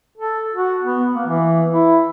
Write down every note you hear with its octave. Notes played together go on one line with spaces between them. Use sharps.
A4
F#4
B3
A#3
E3
E4